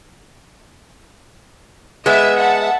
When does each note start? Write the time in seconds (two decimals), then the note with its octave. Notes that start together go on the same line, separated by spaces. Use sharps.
2.06 G#3 B3 E5
2.38 E5 F#5 A5